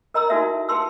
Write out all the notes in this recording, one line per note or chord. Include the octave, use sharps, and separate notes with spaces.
A#4 D#5 A#5 B5 E6
D#4 E4 F#4 A4 A#4 E5
G#4 B4 A5 C6 E6